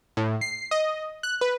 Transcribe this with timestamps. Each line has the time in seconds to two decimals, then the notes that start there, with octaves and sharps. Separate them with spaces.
0.17 A2
0.41 C7
0.71 D#5
1.23 F#6
1.41 B4